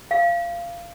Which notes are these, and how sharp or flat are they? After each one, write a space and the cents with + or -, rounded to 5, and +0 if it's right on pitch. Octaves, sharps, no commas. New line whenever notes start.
F5 -20